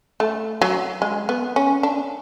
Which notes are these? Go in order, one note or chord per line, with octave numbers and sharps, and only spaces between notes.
A3
F#3
G#3
B3
C#4
D4